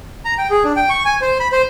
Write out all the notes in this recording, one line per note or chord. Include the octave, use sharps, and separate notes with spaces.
A#5
G5
G#4
D4
G5
C#6
G#5
C5
B5
C5